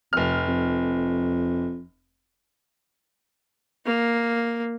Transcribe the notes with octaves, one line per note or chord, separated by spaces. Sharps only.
F1 F2 F6
F2
A#3